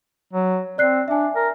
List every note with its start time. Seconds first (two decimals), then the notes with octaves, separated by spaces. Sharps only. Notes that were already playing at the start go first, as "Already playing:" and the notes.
0.33 F#3
0.78 C4 D5 F#6 C7
1.08 D4 E5 G#5
1.36 A#4